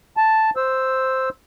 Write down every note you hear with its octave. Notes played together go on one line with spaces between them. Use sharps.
A5
C5 E6